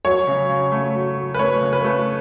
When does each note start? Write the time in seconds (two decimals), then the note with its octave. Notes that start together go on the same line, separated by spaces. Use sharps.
0.05 F#3 C#5
0.27 C#3
0.49 C#3
0.72 A3
0.95 F#3
1.17 F#3
1.34 B4
1.39 A3 C#5
1.61 C#3
1.73 B4
1.84 A3